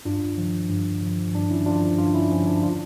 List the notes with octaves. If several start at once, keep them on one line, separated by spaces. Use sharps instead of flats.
G2 D4 F4
D3 F3
G2
D3 F3
G2 D4
C#4 E4
D3 F3 D4 F4
G2 D4 F4
C#4 E4
D3 F3 C#4
D4
D4 F4